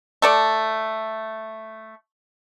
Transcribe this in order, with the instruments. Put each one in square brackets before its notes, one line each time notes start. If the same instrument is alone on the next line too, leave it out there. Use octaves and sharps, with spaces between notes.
[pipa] A3 A4 D5